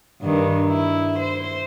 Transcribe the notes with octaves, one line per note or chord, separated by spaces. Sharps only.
G2 D#3
E4
C5